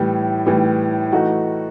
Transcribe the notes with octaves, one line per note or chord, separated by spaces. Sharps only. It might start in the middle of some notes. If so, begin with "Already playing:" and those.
Already playing: A2 E3 G3
A2 E3 G3
E3 A3 D#4 F#4